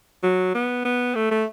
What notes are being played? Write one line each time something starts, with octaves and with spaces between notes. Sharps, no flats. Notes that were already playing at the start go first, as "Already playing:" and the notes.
F#3
B3
B3
A3
A3